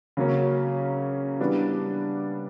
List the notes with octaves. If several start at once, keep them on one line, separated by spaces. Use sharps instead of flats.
C#3 F#3 A#3 C#4
E3 G3 B3 D4